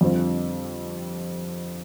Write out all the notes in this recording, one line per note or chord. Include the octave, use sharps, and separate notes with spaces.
F2 D3 G3 C4 F4